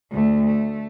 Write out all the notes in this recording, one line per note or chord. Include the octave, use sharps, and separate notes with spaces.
D2 A3
A3